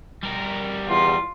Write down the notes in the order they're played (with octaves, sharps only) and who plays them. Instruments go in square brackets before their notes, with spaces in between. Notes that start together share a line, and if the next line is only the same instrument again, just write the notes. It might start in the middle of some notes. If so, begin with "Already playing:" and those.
[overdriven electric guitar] G3 A#4
[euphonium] E2 [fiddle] F4